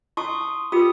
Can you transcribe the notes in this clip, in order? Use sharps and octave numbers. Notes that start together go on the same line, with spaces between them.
E4 A5 C6 C#6 D#6
A5
F4 G4 A#4 D#6